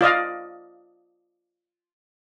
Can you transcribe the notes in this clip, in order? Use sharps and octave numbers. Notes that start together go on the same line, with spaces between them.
F4 D5 D#5 F5